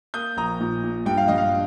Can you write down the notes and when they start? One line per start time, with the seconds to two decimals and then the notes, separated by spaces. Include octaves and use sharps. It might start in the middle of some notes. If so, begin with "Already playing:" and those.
0.14 A#3 D#6 G6
0.37 A#1 A#5 D#6
0.60 A#2
0.83 A#2
1.06 G2 G5
1.17 F5
1.28 G2 D#5
1.38 F5